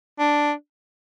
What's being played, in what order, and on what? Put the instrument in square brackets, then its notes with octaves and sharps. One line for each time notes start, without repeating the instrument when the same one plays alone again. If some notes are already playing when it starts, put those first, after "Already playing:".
[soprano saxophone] D4